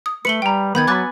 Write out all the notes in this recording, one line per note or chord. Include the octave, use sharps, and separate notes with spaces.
D#6
A3 B4 C#7 F#7 G7
G3 G5 A#5
D#3 B3 B5 G6 G#6
F#3 G#5 B5 D6 F#6 A6